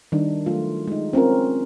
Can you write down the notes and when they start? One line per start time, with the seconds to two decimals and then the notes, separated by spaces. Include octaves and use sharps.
0.12 D#3 G3 D4 D#4
0.46 F#3 A3 F4
0.87 G#3 D#4
1.13 C4 C#4 F4 A#4